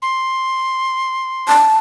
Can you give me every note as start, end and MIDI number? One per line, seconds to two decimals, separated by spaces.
0.02 1.54 84
1.48 1.77 81